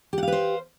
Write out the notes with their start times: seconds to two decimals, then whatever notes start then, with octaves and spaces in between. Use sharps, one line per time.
0.13 G4
0.18 F#5
0.23 F5
0.28 B4
0.32 C5